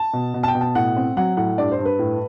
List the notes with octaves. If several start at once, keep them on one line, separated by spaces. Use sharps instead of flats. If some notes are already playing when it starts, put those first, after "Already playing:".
Already playing: A5
B2
B2
A5
G5
B2
A5
A2 F#5
C4
F#3 F#5
A2 F#5
G2 D5
C5
G2
B4
A2